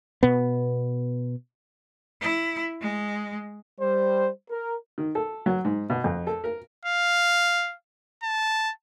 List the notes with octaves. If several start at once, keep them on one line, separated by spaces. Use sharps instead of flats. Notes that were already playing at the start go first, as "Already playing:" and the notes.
B2 B3
E4
G#3
G3 C5
A#4
D#3
A4
F#3
G#2
B2
F2
A4
A#4
F5
A5